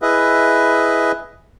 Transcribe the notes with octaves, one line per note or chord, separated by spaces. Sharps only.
E4 G#4 B4 D#5 E5